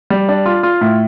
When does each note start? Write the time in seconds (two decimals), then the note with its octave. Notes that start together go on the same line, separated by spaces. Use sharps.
0.10 G3
0.29 D4
0.46 F4
0.63 F4
0.81 A2